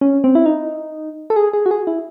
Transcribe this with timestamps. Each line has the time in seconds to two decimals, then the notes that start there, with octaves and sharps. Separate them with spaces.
0.01 C#4
0.24 C4
0.35 E4
0.46 D#4
1.30 A4
1.36 G#4
1.53 G#4
1.66 F#4
1.71 G#4
1.87 E4